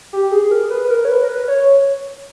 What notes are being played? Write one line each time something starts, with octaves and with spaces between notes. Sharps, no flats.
G4
G#4
G#4
A#4
B4
B4
A#4
C#5
B4
A#4
B4
C#5